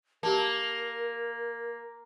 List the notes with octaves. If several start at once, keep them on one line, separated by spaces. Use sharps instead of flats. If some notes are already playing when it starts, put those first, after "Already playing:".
A#3 G4 A#4 A5